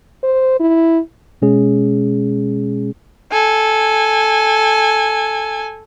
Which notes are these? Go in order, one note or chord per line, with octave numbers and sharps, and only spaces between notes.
C5
E4
B2 G#3 C#4 G#4
A4 G#5